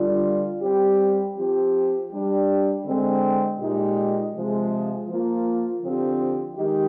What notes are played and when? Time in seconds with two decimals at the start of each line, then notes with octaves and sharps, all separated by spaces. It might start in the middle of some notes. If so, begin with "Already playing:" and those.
Already playing: D3 G3 D4 F4
0.61 G3 C4 G4
1.36 F3 C4 G4
2.10 G3 D4 G4
2.84 D3 G#3 C4
3.59 A#2 G#3 D#4 G4
4.34 C3 F3 G#3
5.07 F3 A#3 F4
5.81 D3 F3 C4 G4
6.57 D#3 G#3 D#4 G4